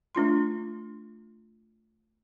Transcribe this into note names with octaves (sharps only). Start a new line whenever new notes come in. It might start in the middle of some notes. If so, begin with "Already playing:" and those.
A3 D4 F4 C6